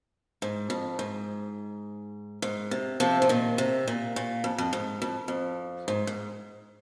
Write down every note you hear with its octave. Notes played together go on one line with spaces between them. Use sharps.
G#2
F2
G#2
G#2
C3
C3 F3
F3
A#2 D#3
C3
A#2
A#2
F2
F2
G#2
F2
F2
G#2
G#2